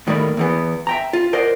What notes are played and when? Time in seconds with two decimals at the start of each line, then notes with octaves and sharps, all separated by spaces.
0.07 A2 D#3 G3 A3 A#3 B5
0.37 E2 E3 B3
0.87 E5 G5 A#5
1.13 F4
1.33 A#4 C5 D5 D#5 F#5